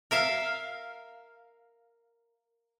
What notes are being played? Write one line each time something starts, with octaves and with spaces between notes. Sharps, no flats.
A#4 E5 F5